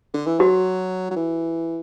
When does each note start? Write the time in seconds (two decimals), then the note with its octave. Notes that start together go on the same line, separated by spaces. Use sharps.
0.14 D3
0.27 E3
0.39 F#3 F#4
1.11 F#3
1.16 E3